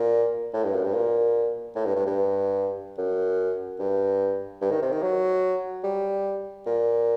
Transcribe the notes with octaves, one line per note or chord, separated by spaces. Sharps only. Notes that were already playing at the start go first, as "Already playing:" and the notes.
Already playing: A#2
A2
G2
F#2
G2
A#2
A2
G2
G2
G2
F#2
G2
G2
D#3
C3
D#3
F#3
G3
A#2